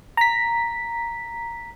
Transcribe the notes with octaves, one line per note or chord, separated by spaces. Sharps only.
A#5 B6